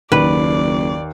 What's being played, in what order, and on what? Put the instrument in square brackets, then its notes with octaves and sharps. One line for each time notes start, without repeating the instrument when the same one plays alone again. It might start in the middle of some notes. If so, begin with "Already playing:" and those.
[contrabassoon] F#1 [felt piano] D#2 [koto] B4 [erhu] D5